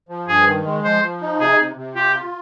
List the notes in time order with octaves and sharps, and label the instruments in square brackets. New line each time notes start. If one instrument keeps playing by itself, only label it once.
[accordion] F3
[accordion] G2 [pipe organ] G#4
[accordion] D#3
G#3
[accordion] F3 [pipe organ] C5
[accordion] F3
D#4
[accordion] C3 [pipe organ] G#4
[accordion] C3
C3
[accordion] F4 [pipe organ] G4
[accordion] F4